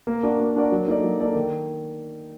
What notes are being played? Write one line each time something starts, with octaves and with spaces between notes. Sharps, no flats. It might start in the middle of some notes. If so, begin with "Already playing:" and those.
A#3
D4 F#4 A#4 D5
A#3
D4 F#4 A#4 D5
F#3
A#3 D#4 A4 D5
F#3
A#3 D#4 A4 D5
D#3